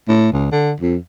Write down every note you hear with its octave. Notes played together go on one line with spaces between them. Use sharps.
A2
C#2
D3
F2